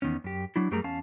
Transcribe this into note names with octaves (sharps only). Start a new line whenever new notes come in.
E2 D#3 B3 C#4
F#2 G4
F#3 D4 E4
F#2 G3 A3 G#4 A#4 A#5
E2 C#4 F5 A5